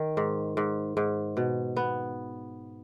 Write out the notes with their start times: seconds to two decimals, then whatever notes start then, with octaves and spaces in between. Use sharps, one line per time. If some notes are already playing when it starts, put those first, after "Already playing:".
Already playing: D#3
0.17 G#2
0.57 G#2
0.97 G#2
1.37 B2
1.76 B3